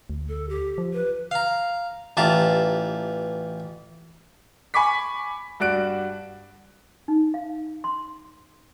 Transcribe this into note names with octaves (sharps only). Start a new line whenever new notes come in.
D2
A4
G4
F3
B4
F5 A#5
A1 E3 F4 G4 A5 A#5
G#5 B5 C#6 D6 B6
G2 F#4 D5 F#6 D7
D#4
F5
C6